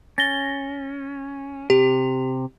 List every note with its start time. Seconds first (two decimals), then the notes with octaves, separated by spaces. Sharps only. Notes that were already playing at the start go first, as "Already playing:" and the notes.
0.18 C#4 A6 A#6 G7
1.70 C3 G4